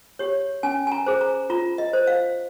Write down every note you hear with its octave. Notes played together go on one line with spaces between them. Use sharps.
G4 C#5
C#4 G#5
G#5
A#5
G#4 C5
A#5
F4 A#5
D#5
C5
F5